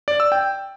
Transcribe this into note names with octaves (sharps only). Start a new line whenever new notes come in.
D5
E6
G5